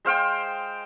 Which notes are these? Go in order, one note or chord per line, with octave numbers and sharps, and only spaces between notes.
G#3 C5 F5 G5